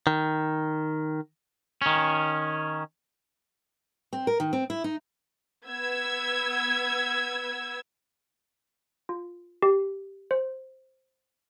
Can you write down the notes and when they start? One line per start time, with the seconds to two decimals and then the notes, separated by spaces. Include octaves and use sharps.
0.07 D#3
1.82 D#3 C#4
4.13 C4
4.27 A#4
4.40 D#3
4.53 C4
4.70 E4
4.84 D#4
5.67 B3 E6 G#6
9.09 F4
9.62 G4
10.31 C5